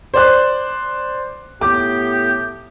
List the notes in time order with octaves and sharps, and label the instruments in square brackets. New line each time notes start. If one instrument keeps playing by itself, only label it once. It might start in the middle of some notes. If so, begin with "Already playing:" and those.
[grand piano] C5 D5 F#6
[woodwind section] A2 B3 G4 [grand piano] D6